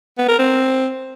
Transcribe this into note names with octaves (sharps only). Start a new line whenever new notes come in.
B3
A#4
C4